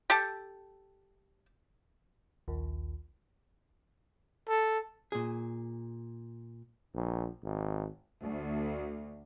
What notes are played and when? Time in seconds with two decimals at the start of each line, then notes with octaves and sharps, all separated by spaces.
0.10 G4 A4
2.48 A#1 D#2
4.49 A4
5.12 A#2 G#4
6.94 A#1
7.44 G#1
8.21 D2